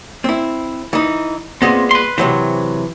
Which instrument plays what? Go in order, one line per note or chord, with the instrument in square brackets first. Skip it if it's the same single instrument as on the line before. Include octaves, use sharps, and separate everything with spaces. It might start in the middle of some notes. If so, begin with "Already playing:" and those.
[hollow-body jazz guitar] C4 E4
E3 D#4
[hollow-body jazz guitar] A#2 G#3 B3 [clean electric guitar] C4
[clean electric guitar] B4 C6
[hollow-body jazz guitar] C3 F#3 C5 [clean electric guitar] E3